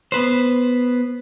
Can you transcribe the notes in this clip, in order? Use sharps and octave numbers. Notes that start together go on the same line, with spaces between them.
B3 B4 C5